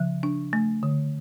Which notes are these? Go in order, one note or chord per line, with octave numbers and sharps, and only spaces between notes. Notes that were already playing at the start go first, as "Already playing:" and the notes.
Already playing: C#3 F3
D4
A3
D3